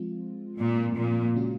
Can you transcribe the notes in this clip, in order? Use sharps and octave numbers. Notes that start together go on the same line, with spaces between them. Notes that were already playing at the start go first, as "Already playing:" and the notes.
Already playing: F3 G#3 C4 F4
A#2
A#2
C#3 G#3 C#4 F#4